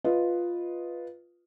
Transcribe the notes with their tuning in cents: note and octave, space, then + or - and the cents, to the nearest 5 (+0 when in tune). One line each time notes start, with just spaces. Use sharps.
F4 +0 B4 +0 D#5 +0